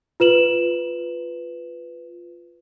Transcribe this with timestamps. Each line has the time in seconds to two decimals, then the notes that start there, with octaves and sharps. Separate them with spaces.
0.20 F4 B4 E7 F#7